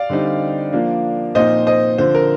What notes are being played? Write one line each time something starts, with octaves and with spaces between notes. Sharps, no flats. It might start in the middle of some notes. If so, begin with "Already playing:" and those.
Already playing: D5 F5
D3 G3 C4 D#4
F3 A#3 D4
A#2 F3 C4 D#4 C5 D#5
C5 D#5
D3 F3 C4 C5
A#4